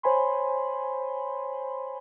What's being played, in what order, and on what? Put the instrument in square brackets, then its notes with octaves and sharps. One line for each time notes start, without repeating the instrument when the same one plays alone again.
[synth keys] C5 C#5 G#5 B5 C6